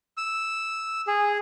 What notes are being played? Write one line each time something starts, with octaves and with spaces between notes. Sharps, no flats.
E6
G#4